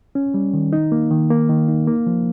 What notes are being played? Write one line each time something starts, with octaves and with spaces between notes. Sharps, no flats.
C#4
G3
D#3
D#4
A#3
D#3
A#3
D#3
D#4
A#3
F3